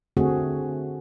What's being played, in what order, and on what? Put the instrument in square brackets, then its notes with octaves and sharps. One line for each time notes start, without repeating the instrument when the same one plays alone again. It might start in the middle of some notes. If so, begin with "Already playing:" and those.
[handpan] D3 A3 C4 F#4 G#4